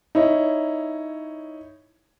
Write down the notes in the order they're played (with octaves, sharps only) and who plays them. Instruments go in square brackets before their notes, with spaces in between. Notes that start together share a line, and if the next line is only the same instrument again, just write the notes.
[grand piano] D#4 E4 C#5